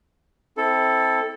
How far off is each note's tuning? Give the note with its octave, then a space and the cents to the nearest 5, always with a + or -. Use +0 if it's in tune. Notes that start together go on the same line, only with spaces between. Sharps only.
C4 +0 E4 -35 A4 +0